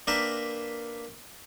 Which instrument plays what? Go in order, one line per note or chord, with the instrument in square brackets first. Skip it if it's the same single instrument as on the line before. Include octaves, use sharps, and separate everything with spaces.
[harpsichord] A#3 D4 A#4 B4 E5 G5